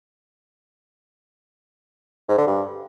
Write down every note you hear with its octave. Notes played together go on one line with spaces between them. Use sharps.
G#2
D3
G2